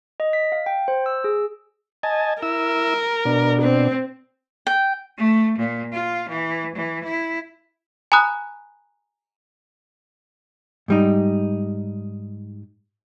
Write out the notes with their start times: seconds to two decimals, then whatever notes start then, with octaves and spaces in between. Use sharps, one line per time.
0.20 D#5
0.33 B6
0.52 F5
0.66 G5
0.88 C5
1.06 E6
1.24 G#4
2.03 D#5 G#5 A5
2.43 E4 A#4 E6
3.25 B2 D4
3.61 C4
4.67 G5
5.18 A3
5.58 A#2
5.92 F4
6.29 E3
6.75 E3
7.04 E4
8.12 G#5 A#5 B5 D#6 F#6
10.88 G#2 G3 D#4